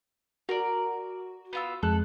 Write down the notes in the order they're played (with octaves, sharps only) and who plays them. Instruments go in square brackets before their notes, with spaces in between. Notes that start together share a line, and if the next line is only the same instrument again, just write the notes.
[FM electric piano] F#4 [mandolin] A#4 D5
[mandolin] B3 F4 E6
[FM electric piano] F2 G#3 F#6 [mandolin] A4